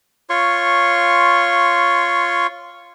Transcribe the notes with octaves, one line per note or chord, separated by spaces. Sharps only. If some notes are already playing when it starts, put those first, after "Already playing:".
F4 C#5 C6 C#6